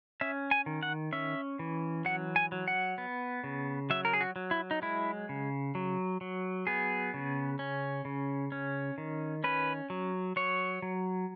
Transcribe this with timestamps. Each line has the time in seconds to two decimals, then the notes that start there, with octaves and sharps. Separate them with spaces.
0.21 C#4 E5
0.51 G#5
0.66 D#3
0.83 F#5
1.13 C#4 E5
1.59 E3
2.05 F#3 F#5
2.36 G#5
2.52 F#3
2.68 F#5
2.98 B3
3.44 C#3
3.90 F#3 E5
4.05 A#4
4.13 G#4
4.21 F#4
4.36 F#3
4.51 E4
4.71 D#4
4.82 G#3 E4
5.29 C#3
5.75 F#3
6.21 F#3
6.67 B3 G#4
7.14 C#3
7.59 C#4
8.05 C#3
8.52 C#4
8.98 D#3
9.44 C#4 B4
9.90 F#3
10.36 F#3 C#5
10.82 F#3